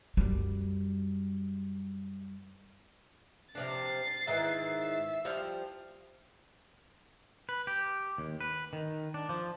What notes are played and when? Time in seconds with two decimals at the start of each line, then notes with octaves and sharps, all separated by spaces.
0.17 F#2 G3
3.55 C3 F3 D4 A6 C7
4.27 G#2 D#3 E3 E5
5.25 F3 G3 F4
7.49 B4
7.67 G4
8.18 D#2
8.41 B4
8.73 D#3
9.14 D4
9.29 F3